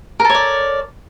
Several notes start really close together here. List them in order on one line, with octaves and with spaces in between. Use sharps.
A#4 A4 C#5 D5